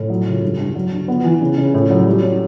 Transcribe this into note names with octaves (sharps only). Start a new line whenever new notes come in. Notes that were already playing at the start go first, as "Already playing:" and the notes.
Already playing: A2
F#3
C#2
G2
G2
F#3
D3
B3
E3
C#3
C#3
A2
F#3
G3
C#4